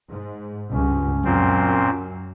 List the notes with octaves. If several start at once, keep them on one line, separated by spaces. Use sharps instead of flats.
G#2
C#2 G2 C#4
F#2 A#2 C4